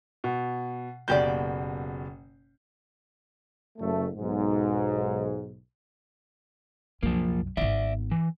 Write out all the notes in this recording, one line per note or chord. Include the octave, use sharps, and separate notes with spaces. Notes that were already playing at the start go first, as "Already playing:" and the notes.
B2
F#1 B2 A#3 G4 D5 G6
F#1 A3
B1 G#2
C2 F#2 F3 A#3
G#1 B3 D5 E5
E3